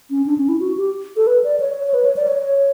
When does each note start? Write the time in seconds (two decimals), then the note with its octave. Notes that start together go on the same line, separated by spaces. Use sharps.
0.10 C#4
0.26 D4
0.38 C#4
0.49 E4
0.60 F#4
0.77 G4
1.17 A4
1.27 B4
1.44 D5
1.60 C#5
1.87 C#5
1.94 B4
2.05 C#5
2.17 D5
2.28 C#5